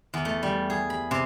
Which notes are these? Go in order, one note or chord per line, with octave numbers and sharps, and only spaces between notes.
E2
A3
G3
G#4
B5
C3